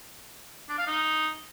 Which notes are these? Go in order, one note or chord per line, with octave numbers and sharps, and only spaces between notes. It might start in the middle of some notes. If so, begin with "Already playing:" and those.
D4
F5
D#4